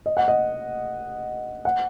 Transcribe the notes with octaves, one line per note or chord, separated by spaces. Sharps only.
D#5
F#5
D#5
F#5